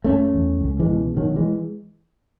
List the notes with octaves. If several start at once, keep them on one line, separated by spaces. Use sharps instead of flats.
F#1 A3 C#4
E2
C#2
E3 G#3
B2
B2 D#3 F#3
E3 G#3